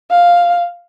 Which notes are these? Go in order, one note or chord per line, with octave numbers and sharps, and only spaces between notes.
F5